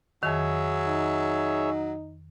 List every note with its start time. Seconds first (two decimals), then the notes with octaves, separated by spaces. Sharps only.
0.23 F2 D#3 F#3 G#4 C#5 E5
0.87 D#4